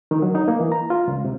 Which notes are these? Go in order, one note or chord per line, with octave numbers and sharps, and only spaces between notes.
D#3
F#3
D#4
A#3
E3
A#5
F4
C#2
C3